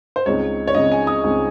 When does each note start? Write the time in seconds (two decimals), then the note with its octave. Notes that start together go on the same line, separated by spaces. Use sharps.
0.16 C5
0.26 C#2 C#3 G#3 C4 D#4 C#5
0.67 C#5
0.75 C#2 C#3 G#3 C4 D#4 D#5
0.92 G#5
1.07 D#6
1.24 C#2 C#3 G#3 C4 D#4